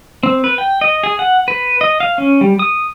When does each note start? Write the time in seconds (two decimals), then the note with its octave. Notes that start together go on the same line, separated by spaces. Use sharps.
0.23 C4
0.44 B4
0.58 G5
0.81 D#5
1.03 G#4
1.19 F#5
1.48 B4
1.81 D#5
2.00 F5
2.18 C#4
2.41 G3
2.59 D#6